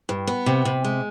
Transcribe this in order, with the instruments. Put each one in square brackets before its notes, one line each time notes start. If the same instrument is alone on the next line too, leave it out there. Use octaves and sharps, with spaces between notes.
[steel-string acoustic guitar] G2
B3
C3
C3
G#3